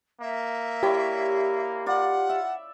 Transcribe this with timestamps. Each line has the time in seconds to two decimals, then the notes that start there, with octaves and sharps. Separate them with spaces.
0.21 A#3 E5
0.83 E4 G4 C#5 D5
1.86 F4 D5 F#5
2.29 E5